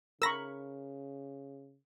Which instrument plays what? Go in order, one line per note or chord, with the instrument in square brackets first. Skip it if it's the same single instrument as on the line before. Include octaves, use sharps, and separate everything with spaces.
[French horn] C#3 [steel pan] A#4 B5 C#6 [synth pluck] E6 A#6